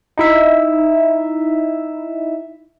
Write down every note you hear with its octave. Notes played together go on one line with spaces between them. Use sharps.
D#4 E4 E5